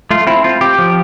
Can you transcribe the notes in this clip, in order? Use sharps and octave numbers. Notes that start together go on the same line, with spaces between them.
A3 F4
C4 E4
C4 F4
C4 G4
F3